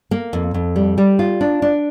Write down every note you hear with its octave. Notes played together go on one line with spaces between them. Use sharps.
A#3
F2
F2
G3
G3
F4
D4
D4